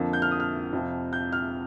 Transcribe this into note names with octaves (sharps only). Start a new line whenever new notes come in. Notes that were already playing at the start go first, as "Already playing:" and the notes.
Already playing: F2 D3 F3 A#3
G6
F6
D#6
F6
F2 C3 F3 C4
G6
F6